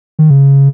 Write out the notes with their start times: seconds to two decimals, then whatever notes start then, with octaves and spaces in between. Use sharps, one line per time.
0.19 D#3
0.30 C#3